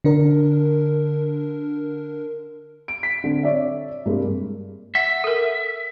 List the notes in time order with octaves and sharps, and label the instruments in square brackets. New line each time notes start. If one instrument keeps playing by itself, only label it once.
[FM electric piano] D3 D4 A#4
[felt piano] D7
B6
D3 C4
C#5 D5 E5
G2 C3 G#3 A#3
[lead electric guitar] E5 [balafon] F#5
[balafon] A4 A#4